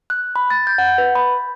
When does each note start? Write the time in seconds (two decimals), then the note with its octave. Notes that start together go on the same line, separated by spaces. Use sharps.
0.10 F#6
0.36 B5
0.50 A6
0.67 G6
0.78 F#5
0.98 B4
1.15 B5